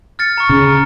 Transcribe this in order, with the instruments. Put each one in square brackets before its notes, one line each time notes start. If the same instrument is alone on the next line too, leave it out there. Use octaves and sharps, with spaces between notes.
[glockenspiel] F6 A6 C#7
A#5 C#6
[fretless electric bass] C#3
[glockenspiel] F6